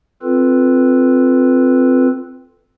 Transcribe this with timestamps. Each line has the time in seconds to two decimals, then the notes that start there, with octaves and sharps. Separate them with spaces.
0.23 C4 F4 A4 B4